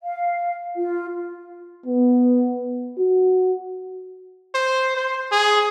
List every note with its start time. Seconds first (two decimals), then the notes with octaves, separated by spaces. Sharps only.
0.03 F5
0.76 F4
1.86 B3
2.99 F#4
4.55 C5
4.97 C5
5.32 G#4